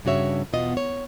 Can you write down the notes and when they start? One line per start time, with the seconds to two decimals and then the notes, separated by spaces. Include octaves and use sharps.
0.05 G2 C#3 F#4 C#5 E5
0.53 E2 B2 B3 F4 D#5
0.77 C#5